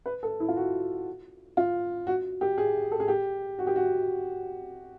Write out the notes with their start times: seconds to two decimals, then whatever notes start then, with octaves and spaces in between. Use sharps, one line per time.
0.06 B4
0.23 A4
0.40 E4
0.48 F4
0.56 F#4
1.57 F4
2.07 F#4
2.41 G4
2.58 G#4
2.92 A4
3.00 G#4
3.08 G4
3.59 F#4
3.67 G4
3.76 F#4